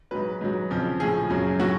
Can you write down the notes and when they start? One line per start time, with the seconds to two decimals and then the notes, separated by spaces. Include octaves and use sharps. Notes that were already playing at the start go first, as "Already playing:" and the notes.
0.11 G#2 F#3 B4
0.41 G#2 F#3
0.70 F2 C#3 F3
1.00 A2 F3 G#4
1.30 F#2 C#3 F#3
1.60 A2 F#3 F#4